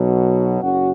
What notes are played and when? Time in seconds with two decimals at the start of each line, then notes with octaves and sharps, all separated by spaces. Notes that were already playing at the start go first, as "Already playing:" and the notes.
Already playing: B1 B2 F#3
0.61 F#1 F#2 C#4 F#4